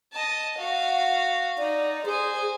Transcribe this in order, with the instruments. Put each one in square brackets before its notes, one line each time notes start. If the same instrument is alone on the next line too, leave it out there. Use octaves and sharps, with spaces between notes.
[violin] D#5 A5
F#4 F5
[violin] D#4 [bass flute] D5
[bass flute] G#4 [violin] C5 G#5